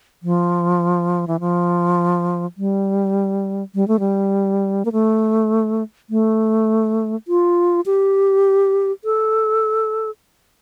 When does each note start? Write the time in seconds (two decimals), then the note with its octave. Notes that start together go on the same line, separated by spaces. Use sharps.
0.23 F3
1.28 E3
1.40 F3
2.58 G3
3.75 G3
3.88 A3
4.00 G3
4.85 A#3
4.92 A3
6.10 A3
7.28 F4
7.86 G4
9.04 A4